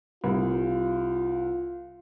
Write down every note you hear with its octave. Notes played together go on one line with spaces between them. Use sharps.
C2 F4